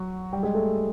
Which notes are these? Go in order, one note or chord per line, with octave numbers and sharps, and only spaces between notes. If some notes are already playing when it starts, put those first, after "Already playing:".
Already playing: F#3 F#4
G3 G4
G#3 G#4
A3 A4